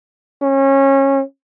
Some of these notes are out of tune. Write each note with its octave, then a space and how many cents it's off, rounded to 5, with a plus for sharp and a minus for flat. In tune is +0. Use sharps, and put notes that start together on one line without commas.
C#4 -25